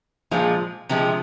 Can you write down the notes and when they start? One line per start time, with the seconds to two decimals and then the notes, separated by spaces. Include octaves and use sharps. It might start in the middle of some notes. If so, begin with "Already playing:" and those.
0.31 A#2 F3 G#3
0.89 C3 F3 G#3